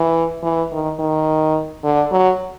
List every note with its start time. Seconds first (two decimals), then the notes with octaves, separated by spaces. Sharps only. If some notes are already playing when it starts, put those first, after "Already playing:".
Already playing: E3
0.43 E3
0.72 D#3
0.99 D#3
1.83 D3
2.11 F#3